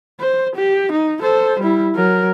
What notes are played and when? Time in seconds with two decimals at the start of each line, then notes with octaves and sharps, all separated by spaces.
0.20 C5
0.55 G4
0.92 D#4
1.22 A4 C5
1.60 G3 E4
1.96 F#3 A#4